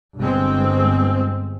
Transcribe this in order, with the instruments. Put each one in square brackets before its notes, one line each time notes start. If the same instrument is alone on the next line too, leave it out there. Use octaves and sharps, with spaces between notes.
[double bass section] G1 G#3 C4